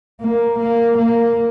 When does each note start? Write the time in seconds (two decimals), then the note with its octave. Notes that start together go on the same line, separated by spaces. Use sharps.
0.21 A#3
0.59 A#3
0.98 A#3